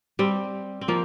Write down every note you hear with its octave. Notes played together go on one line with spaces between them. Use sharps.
G3 C4
C4
F3 A#3